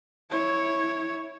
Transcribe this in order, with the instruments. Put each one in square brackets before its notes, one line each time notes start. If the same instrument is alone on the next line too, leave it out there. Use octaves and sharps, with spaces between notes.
[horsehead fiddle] E4 C#5